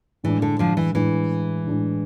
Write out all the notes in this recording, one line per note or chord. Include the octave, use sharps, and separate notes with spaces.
A2 E3 G#3 D4
D3
D3 F3
E3
A2 E3 G#3 D4
A2 G#3 D4